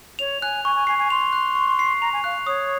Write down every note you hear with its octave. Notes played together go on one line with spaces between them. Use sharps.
C#5 F7
G#5 F#6
G#5 C#6
G#5
G#5 C7
G#5
C6 F7
F#6
C#6
C7
A#5 F7
G#5
F5 F#6
C#5 D#6